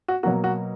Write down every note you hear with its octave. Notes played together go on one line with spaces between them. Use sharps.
F#4
B2 F#3 A#3 F#4
F#4